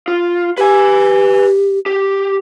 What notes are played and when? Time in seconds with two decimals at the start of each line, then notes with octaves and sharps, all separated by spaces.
0.08 F4
0.58 G4 B4 G#5
1.86 G4